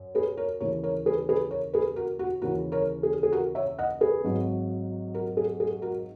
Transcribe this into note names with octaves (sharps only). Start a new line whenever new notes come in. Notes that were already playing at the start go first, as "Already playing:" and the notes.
Already playing: F#2
G#4 B4
A#4 C#5
D#2 C#3 E3 A#4 C#5
A#4 C#5
G#4 B4
G#4 B4
A#4 C#5
G#4 B4
F#4 A#4
F#4
D#2 C#3 E3 F#4 A#4
A#4 C#5
G#4
G#4
F#4 A#4
C#5 E5
D#5 F#5
G#4 B4
G#1 G#2 F#3
F#4 A#4
G#4
G#4
F#4 A#4